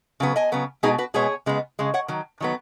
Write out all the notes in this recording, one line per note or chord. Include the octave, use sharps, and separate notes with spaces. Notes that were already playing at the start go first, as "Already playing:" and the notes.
C#3 F#3 B3
D#5 G#5
C#3 F#3 B3
B2 G#3 B3 D#4 G#4
F#4 B4
B2 G#3 B3 G#4 C#5
C#3 G#3 B3
C#3 G#3
C#5 F#5
D#3 F#3
D#3 F#3 B3